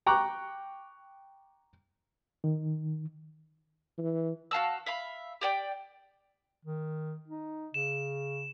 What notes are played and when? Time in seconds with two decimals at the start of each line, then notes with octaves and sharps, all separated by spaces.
0.06 G5 A#5 C#6 D6 F#6
2.44 D#3
3.98 E3
4.51 F#4 F5 A5 E6
4.86 E5 F5 B5
5.41 G4 D5 G5
6.65 D#3
7.28 D#4
7.74 C#3 E7